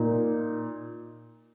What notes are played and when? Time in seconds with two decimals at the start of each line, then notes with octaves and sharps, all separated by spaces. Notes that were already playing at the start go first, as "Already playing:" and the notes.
Already playing: A#2 A#3 D#4